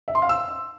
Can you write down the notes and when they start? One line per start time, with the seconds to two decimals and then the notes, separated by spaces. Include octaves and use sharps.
0.08 E5
0.15 C6
0.22 F5
0.29 E6